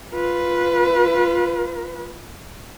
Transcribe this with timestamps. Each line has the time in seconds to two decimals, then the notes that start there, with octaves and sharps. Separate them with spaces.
0.13 F4 B4